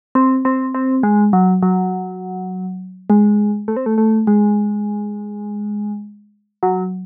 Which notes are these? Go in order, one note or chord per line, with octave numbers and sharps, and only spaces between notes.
C4
C4
C4
G#3
F#3
F#3
G#3
A3
C4
A3
A3
G#3
F#3